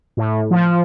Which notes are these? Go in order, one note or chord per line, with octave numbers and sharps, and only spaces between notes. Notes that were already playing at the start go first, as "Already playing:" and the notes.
A2
F3